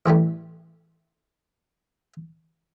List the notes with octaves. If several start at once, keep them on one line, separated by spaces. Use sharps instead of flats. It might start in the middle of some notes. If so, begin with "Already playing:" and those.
A1 E3 G3 A3